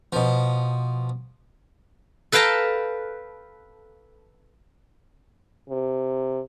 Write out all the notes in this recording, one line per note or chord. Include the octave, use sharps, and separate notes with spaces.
B2 F3
A4 B4 F5 G5 A5 A#5
C3